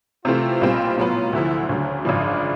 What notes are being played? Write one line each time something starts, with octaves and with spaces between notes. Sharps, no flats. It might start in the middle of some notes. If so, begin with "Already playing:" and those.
C3 E3 A3 C4 F4
B1 A#2 G3 C4
A2 F#3 B3 F4
D2 D3 F3 E4
D2 C#3 F#3 D4
G#1 F#2 C#3 F3 D4